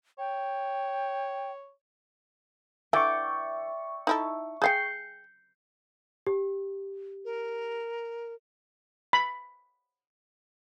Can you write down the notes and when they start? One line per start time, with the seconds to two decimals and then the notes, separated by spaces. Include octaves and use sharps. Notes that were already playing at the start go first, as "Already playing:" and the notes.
0.19 C#5 G5
2.93 D3 E3 D5 E5 G5 C#6
4.07 D#4 E4 A4
4.62 G#4 F5 G5 G6 C7 C#7
6.27 G4
7.25 A#4
9.13 B5